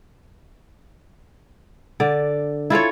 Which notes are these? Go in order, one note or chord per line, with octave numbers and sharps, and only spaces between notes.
D3 D5
E4 F4 A4 C#5